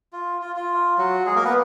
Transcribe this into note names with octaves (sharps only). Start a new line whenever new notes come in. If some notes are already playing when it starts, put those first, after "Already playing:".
F4
F4
F4
F#3 F#4
G#3 G#4
A#3 A#4
B3 B4